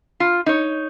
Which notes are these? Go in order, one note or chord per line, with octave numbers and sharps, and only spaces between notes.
F4
D#4 C#5